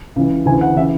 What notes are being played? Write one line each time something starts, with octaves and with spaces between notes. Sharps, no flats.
C#2 C#3 E3
D2 C#3 E3 G#5
F#5
C#3 E3 E5